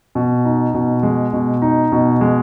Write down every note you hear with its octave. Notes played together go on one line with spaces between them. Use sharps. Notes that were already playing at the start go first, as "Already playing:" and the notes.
B2
D#4
B2
G#3
B2
D#4
B2
G#3